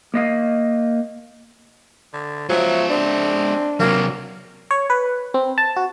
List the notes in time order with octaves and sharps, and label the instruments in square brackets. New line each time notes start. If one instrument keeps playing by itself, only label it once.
[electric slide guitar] A#3 D#5 F5
[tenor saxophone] D3
[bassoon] F3 [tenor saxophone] F#3 [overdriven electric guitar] G#3 E5
[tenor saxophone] C4 [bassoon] D4
[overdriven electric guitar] C3 F#3 [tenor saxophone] A#3
[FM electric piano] C#5
B4
C4
A5
F#4